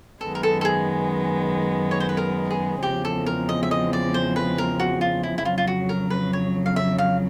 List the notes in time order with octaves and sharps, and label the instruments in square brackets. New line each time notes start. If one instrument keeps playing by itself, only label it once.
[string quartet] F#2 D#3 G#3 B3 [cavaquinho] A4
[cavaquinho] A#4
A4
A4
G#4
C#5
C5
B4
A#4
G#4
[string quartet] E2 C#3 F3 G#3 C4 [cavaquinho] G4
[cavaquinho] A4
A#4
D#5
E5
D#5
D5
C5
B4
A#4
F#4
F4
E4
E4
[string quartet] F2 C#3 F#3 [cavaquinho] F4
[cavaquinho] F4
F#4
A#4
B4
C#5
F5
E5
F5